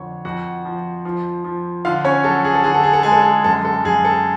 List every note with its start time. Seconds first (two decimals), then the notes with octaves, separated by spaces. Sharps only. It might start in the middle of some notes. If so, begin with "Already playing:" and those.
Already playing: F2 D3 C#5
0.25 F2 F#4 F#5
0.65 F3
1.05 F3
1.44 F3
1.85 D3 F4 F5
2.05 C#4 C#5
2.24 F#3 A4
2.44 G#4
2.54 A4
2.64 D3 G#4
2.74 A4
2.84 G#4
2.93 A4
3.03 G#3 G#4
3.12 A4
3.22 G#4
3.44 F#2 A4
3.65 A4
3.84 F#2 G#4
4.05 A4